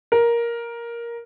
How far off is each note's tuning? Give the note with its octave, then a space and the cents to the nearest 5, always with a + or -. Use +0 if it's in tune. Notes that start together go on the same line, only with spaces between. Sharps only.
A#4 +10